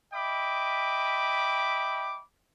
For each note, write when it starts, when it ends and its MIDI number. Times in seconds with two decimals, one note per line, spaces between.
0.14 2.21 75
0.14 2.21 76
0.14 2.21 79
0.14 2.21 83
0.14 2.21 86